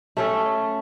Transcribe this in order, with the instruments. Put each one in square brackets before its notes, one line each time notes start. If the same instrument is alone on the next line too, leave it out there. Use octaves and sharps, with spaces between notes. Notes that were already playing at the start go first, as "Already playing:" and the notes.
[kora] A3 C#4 A4